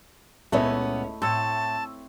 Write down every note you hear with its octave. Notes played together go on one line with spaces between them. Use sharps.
C#2 A#2 A3 B3 C#4 E4 C#5 D#5
A2 C4 C#5 A5 E6